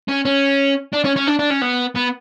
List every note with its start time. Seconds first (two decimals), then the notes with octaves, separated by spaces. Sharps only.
0.08 C#4
0.25 C#4
0.93 D4
1.05 C#4
1.17 C#4
1.28 D4
1.39 D4
1.51 C#4
1.62 B3
1.96 B3